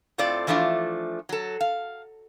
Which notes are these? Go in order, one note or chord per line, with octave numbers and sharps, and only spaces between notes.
A2 C4 F4 A4 D5
E3 F3 A3 D4 F4
F#3 A4
F5